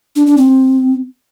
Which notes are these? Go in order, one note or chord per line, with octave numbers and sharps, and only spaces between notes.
D4
D4
C4